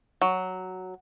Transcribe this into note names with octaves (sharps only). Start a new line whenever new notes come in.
F#3